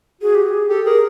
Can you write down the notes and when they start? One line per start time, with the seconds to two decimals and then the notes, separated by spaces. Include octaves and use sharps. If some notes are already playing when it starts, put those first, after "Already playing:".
0.21 F#4 G#4
0.35 G4
0.48 G#4
0.69 G4 A4
0.85 G#4 A#4